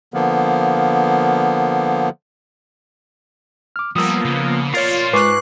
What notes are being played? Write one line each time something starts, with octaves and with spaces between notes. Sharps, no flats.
D3 F3 A#3 B3
D6 F6
F3 G3 A#3 B3 D#6 E6
C#3
F4 A#4 C#5 D5 A6 C7
G#2 B4 G#5 C#6 D6 F#6 C7